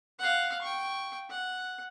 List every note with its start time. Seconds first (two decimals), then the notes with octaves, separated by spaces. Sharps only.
0.19 F5 F#5
0.62 G5 C#6
1.30 F#5